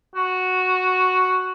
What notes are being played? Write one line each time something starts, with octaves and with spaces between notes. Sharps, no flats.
F#4